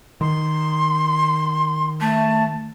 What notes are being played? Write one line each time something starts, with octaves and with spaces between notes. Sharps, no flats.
D#3 C6
A3 A5